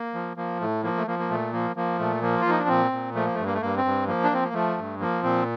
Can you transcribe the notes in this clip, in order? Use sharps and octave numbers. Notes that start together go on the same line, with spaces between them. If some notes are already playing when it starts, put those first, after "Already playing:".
Already playing: A#3
F3
F3 A#3
A2 A3
F3 A#3
A3
F3 A#3
A#3
A#2 A3
F3 A#3
F3 A#3
A#2 A3
F3 A#3
F4
F3 D#4
D4
A#2 C4
A#2
F3 A3
A#3
G2 A3
A#3
A3
G2 A#3
C4
G2
F3 A#3
D4
F3 C4
A#3
F3 A3
G2
F3 A#3
A#2 C4